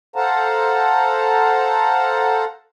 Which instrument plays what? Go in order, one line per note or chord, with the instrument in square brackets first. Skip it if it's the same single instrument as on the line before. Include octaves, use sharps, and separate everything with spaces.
[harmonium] A4 C5 F5 F#5 A5 A#5